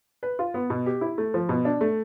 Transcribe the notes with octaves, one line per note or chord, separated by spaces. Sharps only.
B4
F4
B3
B2
G4
E4
A3
F3
B2
D4
A3